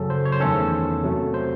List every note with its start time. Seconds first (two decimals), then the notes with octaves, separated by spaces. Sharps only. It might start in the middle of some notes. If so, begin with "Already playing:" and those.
Already playing: F#2 C#3 F#3 C#4 A4
0.10 C5
0.25 C#5
0.32 C5
0.40 E2 D#3 A3 C#4 A4
1.03 C3 F#3 A3
1.34 C5